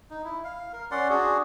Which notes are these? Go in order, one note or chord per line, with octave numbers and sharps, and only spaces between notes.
D#4
E4
F5
A#4
C#4 D5 F#5 C6
D4 F#4 G#4